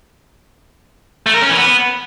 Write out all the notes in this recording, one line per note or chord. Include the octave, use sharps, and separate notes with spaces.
A3
A#4
C#4
E3
B3